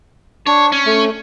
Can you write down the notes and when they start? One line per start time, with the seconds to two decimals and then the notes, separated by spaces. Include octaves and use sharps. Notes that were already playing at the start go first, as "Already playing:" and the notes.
0.47 D4 C#5
0.72 C#4
0.86 A3